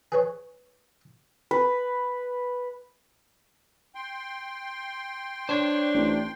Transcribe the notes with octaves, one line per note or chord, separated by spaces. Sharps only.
G#4 B4 C#5
B4
G5 C6
D4 C5 C#5
A1